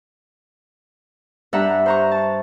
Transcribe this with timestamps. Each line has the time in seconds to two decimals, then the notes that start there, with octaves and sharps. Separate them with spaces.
1.53 G2 D4 E5 F#5 A#5
1.86 C5 A#5 C#6
2.11 A5